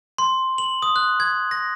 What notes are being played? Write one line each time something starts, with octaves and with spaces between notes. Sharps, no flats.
C6
F#7
D#6
F#6
G#6
A#6